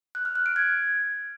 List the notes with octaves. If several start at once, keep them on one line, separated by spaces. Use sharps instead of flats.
F#6
F6
F#6
D7
G#6